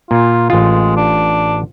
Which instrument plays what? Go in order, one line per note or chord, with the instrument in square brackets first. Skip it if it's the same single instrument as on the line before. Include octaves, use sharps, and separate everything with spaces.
[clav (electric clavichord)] A#2 [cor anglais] F4
[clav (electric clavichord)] A1 F4 [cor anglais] G#3
[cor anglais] D4